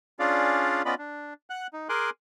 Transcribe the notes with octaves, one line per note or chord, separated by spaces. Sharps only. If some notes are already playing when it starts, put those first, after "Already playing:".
C#4 D4 F4 G#4 D5 F5
B3 C#4 F4 D5 D#5 B5
D4
F#5 F#6
D#4
G#4 A#4 G#5 C6 D6 F#6